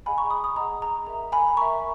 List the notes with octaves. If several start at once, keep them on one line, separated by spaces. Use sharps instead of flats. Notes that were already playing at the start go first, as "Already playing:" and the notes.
G#4 D#5 F#5 G#5 B5
A#5 C#6
B5 D#6
B5 D#6
G#4 D#5 F#5 A#5
A#5
A#4 E5 A#5
G#5 B5
A#4 E5 A#5 C#6